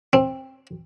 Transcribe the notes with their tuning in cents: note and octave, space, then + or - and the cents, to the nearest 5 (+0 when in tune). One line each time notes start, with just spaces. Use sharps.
C4 +20